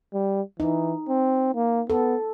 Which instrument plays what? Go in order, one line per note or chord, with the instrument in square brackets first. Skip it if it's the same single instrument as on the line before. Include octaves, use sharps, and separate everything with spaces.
[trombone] G3
[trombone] E3 [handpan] D#4
[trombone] C4
A#3
[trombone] B3 [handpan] A4